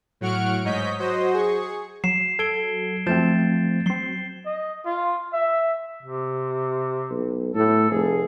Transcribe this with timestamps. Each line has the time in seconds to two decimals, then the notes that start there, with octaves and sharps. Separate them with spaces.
0.21 A2 F#3 F#5 C#6 F6 D7
0.64 G#2 C#5 D#5 G6 B6
0.99 F#3 F#4 C5 D#5
1.34 G#4 C#6
2.04 F#3 C7 E7
2.39 A4 G#6 D7 G7
3.07 F3 A3 C4 G6 A6 E7
3.86 F#3 C4 C7 G7
4.46 D#5
4.86 F4
5.33 E5
6.03 C3
7.11 B1
7.55 A2 A4
7.91 F1 G#4